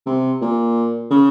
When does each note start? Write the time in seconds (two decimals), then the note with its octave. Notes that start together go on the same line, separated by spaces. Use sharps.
0.06 C3
0.41 A#2
1.11 C#3